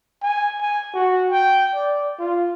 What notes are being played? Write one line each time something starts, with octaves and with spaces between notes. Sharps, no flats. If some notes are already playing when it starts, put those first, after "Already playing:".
G#5
G#5
F#4
G5
D5
F4